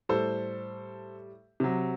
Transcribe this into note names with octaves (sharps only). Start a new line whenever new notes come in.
A2 G3 A4 C5
C3 F#3